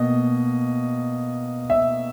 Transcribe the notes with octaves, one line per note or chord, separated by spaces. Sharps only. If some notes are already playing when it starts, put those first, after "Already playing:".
Already playing: B2 A#3 D#5
E5